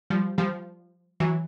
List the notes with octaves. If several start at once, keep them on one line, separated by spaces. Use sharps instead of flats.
F3 G3
F3 G3
E3 F#3